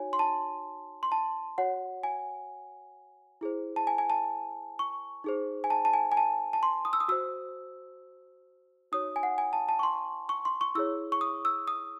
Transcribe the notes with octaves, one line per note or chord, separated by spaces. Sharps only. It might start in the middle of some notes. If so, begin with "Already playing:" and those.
Already playing: D#4 F#4 C#5 G#5
C6
A5
C6
A5
F#4 C#5 F#5
G#5
E4 G#4 C5
A5
G#5
G#5
A5
C#6
D#4 G#4 C5
G#5
A5
A5
G#5
G#5
A5
A5
C6
D#6
E6
D#6
F#4 C5 E6
D#4 F#4 C#5 D#6
G#5
F#5
G#5
A5
A5
C#6
C6
C#6
C6
C#6
E4 G#4 C#5 E6
C#6
D#6
E6
D#6